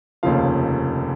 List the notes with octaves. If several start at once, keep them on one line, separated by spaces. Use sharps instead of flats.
F1 D#2 C#3 F3 F5